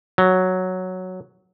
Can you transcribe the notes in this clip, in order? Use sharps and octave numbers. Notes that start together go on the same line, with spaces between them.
F#3